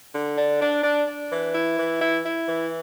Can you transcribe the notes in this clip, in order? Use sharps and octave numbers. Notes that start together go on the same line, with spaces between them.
D3
D4
D4
D4
D4
E3
E4
E3
E4
E4
E3